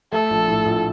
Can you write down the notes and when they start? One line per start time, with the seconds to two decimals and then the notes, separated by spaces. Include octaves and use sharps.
0.13 A3 A4
0.30 A#1
0.48 A2
0.66 A#1